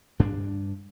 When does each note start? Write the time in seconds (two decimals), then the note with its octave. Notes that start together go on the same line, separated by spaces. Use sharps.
0.19 G2 D4